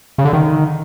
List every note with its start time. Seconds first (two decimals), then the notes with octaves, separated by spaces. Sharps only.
0.18 C#3
0.25 D3
0.33 D#3